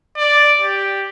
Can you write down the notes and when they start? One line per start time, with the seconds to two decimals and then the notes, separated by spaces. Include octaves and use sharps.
0.18 D5
0.61 G4